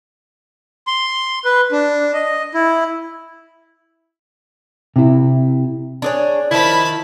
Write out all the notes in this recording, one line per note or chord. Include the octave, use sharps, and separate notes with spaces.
C6
B4
D4
D#5
E4
C3 E4
D4 G#4 C#5
D#3 F3 E4 A5 B5